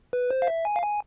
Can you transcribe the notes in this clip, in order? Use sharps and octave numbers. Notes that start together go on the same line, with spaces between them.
B4
C5
F5
E5
G#5
F5
G#5